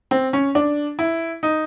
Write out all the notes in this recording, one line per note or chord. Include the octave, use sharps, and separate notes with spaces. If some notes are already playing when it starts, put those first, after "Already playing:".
C4
C#4
D4
E4
D#4